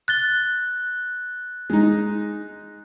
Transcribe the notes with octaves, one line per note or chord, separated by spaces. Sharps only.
F#6 A6 G7
G#3 D#4